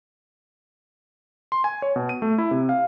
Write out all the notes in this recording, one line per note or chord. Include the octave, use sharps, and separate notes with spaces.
C6
G#5
C#5
B2
D#7
A3
E4
C3
F5